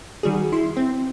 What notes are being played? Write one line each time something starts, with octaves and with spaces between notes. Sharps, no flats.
D#3 G3 F#4 G#4
E4 C6
C4